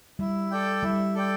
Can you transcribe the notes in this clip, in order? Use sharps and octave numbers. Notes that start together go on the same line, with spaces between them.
G3 E4
A4 D5 G5
G3 E4
A4 D5 G5